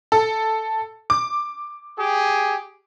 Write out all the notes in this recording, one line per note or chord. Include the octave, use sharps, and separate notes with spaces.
A4
D6
G4 G#4